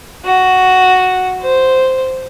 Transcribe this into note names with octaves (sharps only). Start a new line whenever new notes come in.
F#4
C5